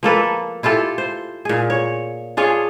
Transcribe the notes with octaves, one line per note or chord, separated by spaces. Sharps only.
F3 A#3 A4 B4
E4 F4 G4 A4
C5
A#2 G#4
C#5
D4 F4 G#4 C#5